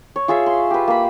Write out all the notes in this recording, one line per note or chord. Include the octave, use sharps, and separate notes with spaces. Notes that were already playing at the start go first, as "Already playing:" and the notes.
C#5
F4 G#4 C#5 E5
C6
G4 B4
A#3 B5